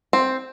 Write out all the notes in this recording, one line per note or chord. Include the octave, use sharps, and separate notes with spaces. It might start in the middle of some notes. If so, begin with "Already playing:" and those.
C4